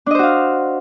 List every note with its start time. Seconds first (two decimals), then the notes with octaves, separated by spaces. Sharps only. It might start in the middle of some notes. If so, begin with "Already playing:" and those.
0.06 D4
0.11 D#5
0.15 C5
0.19 F#4
0.23 F5